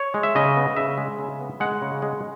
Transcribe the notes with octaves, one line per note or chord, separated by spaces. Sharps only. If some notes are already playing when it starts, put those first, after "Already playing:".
Already playing: C#5
G#3
E5
C#3 D#5
B3
C#3 E5
G#3
C#3
B3
G#3 F#5
C#3
G#3